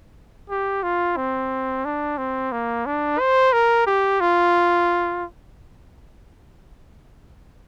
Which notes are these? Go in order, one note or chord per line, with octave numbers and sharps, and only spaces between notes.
G4
F4
C4
D4
C4
A#3
D4
C5
A#4
G4
F4